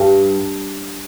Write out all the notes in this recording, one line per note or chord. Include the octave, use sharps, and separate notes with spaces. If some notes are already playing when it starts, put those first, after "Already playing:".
Already playing: G2